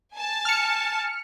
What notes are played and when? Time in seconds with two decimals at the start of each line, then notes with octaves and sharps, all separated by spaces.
0.14 G#5 A5
0.45 F6 C#7